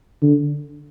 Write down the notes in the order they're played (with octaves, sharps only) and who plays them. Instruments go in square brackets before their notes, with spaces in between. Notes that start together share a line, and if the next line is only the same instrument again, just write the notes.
[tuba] D3